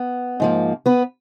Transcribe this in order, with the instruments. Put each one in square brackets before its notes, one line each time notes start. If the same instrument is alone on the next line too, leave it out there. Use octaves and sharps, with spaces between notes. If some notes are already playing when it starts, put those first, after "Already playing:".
Already playing: [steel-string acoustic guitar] B3
G#2 F3 A#3
B3 B4